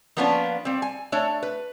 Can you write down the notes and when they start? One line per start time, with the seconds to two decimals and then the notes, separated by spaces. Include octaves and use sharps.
0.17 F3 A#3 B3 C#4 D4 F4
0.65 G3 C4
0.82 G#5
1.12 A3 D4 C#5
1.43 B4